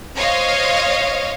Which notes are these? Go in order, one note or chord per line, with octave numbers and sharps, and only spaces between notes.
C5 C#5 D#5 F5